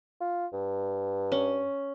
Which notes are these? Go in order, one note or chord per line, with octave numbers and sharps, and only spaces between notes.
F4
G2
C#4